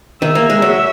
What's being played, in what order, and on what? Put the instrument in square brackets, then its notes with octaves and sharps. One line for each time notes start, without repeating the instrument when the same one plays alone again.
[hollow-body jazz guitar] D#3 [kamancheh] E5
[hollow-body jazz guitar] A#3
G#3
F#3